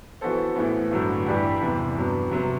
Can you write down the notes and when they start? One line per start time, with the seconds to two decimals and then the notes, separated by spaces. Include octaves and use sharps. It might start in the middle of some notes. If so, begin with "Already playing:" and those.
0.21 E3 B3 F#4 A4 C5
0.56 A2 E3 B3
0.91 G2 D3 F#3 A3
1.26 G2 E3 G3 D4 G4
1.62 E2 C3 E3
1.96 G2 F#3 B3
2.31 C3 F#3 B3